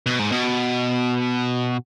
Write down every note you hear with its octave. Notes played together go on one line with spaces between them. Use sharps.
B2
G#2
B2